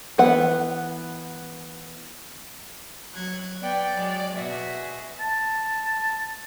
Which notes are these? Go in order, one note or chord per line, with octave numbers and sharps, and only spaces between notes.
E3 B3 F#5
F#3 F#6 G#6
B3 D5 G5
F#3 G#3
B2 F#4 G#4 E5
A5